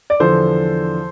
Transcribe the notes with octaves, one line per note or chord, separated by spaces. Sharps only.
D5
E2 D3 F3 A4 C5